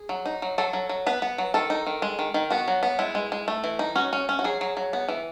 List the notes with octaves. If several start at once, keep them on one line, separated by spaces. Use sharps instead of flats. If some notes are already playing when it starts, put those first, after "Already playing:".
Already playing: G#4
F#3
D#4
F#3
F#3 A4
F#3
F#3
B3 B4
B3
F#3
D#3 A4
D#4
D#3
G#3
D#3
D#3
B3 F#4
F#3
B3
G#3 E4
G#3
G#3
A3
E3
D#4
C#4 F#4
C#4
C#4
F#4
F#3 G#4
F#3
F#3
B3
E3